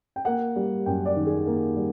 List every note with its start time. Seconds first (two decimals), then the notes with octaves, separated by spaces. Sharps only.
0.16 G5
0.25 A#3 F#5
0.56 G3
0.86 F#2 G5
1.05 D5
1.17 D#3
1.26 G#4
1.46 A#3
1.76 G3